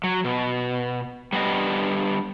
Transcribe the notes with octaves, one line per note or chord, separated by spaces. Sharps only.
F#3
B2
G3 B3 D4 D#5